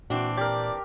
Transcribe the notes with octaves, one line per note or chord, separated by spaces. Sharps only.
A#2 E3 C4 D4 F#4
G4 A#4 D5